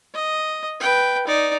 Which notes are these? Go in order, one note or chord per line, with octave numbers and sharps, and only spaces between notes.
D#5
B4 G5
D#4 D5